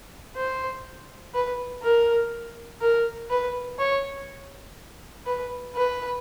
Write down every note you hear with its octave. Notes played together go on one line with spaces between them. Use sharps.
C5
B4
A#4
A#4
B4
C#5
B4
B4